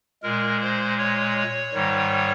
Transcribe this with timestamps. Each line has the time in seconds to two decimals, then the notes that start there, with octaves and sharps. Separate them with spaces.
0.23 A#2 G#3 A#4
0.60 C5
0.98 C#5
1.73 G#2 D#3 G3